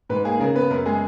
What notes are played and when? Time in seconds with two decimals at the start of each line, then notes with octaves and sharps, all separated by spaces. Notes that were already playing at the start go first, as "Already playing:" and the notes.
0.09 G#2 B4
0.24 A#3 G#4
0.40 C#3 A#4
0.55 B3 B4
0.70 F#2 A#4
0.86 G#3 G#4